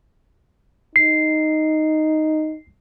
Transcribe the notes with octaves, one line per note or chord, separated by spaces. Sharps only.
D#4 C7